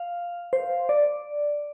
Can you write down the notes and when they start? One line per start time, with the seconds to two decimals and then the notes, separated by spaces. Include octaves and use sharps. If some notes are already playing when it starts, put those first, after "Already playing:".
Already playing: F5
0.53 C5
0.89 D5